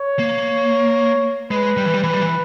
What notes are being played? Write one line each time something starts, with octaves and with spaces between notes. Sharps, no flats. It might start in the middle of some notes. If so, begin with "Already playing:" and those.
Already playing: C#5
A#3
G#3 B4
G3
E3
G3
E3 B4
G3
E3